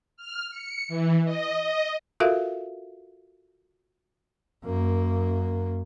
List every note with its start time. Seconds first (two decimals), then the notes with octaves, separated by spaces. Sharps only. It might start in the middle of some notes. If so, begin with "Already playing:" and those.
0.17 F6
0.51 C#7
0.88 E3
1.25 D#5
1.59 D#5
2.20 F4 F#4 A4 A#4 E5 F5
4.64 F#2 A#3